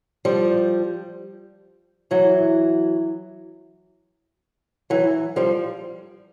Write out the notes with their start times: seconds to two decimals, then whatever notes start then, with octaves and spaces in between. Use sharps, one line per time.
0.25 F3 G3
2.11 E3 F#3
4.90 E3 F#3
5.36 F3 G3